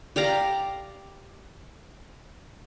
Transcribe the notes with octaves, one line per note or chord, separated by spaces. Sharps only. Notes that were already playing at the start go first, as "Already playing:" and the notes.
G4 D5 F5 A#5